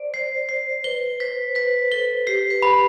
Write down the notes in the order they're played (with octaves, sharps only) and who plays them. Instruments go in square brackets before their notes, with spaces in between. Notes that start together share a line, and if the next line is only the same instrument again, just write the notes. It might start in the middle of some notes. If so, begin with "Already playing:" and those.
Already playing: [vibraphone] C5 D5
[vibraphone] C5 [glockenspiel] C7
[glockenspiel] C7
[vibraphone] B4 [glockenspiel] G7
[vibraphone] C5 [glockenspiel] B6
[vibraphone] B4 [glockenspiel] B6
[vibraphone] A4 [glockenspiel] G7
[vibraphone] G4 [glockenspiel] C7
[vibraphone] B4
[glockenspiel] B5